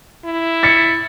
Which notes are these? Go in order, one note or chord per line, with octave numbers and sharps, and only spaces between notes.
E4
A6 B6 C#7